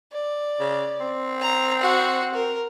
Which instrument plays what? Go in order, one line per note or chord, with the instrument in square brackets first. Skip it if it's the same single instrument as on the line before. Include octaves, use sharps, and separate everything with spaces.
[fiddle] D5
[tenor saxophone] C#3
C4
[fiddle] A#5
F#4 F#5
A#4